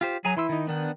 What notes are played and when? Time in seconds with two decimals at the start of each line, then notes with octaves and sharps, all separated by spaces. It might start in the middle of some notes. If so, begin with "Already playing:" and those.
0.01 F4 G4 C5
0.25 F#3 G#4 G#5 A#5
0.37 E3 E4 C6 E6
0.49 D#3 D#4
0.67 D#3 B3 D4 F#5